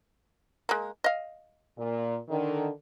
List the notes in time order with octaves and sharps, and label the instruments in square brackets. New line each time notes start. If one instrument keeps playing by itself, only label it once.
[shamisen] G#3 A#3
D#5 F5
[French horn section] A#2
D3 D#3